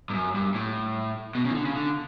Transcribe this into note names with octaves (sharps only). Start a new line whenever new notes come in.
G2
F#2
G2
A2
B2
C#3
E3
D3
C#3
D3